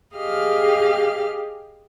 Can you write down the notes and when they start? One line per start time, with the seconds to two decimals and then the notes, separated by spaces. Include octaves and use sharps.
0.15 G4 G#4 D#5 F5 F6